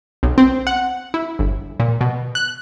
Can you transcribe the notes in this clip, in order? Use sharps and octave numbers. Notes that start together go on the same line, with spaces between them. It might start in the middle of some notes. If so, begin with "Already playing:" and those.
B1
C4
F#5
E4
G1
A#2
B2
F#6